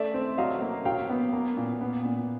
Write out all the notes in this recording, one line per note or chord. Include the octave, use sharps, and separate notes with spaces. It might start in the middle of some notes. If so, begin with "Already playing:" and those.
Already playing: A3 D5 E5
C4
F#3 D#5 F5
A#3
F#3 F5 G5
B3
A#3
A#2
B3
A#2